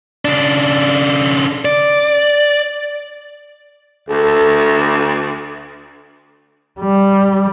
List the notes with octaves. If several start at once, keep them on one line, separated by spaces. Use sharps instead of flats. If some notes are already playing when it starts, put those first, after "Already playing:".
C#3 D4
D5
D2 A4
G3